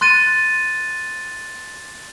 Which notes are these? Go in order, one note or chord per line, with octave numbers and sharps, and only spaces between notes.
C6 F#6 A6 D#7